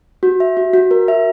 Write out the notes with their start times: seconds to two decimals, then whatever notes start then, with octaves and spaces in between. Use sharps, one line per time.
0.23 F#4
0.40 E5
0.57 F#4
0.73 F#4
0.91 A#4
1.08 E5